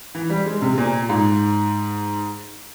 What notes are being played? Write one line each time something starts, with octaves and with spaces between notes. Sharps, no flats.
E3
G3
G#3
C3
A#2
G#2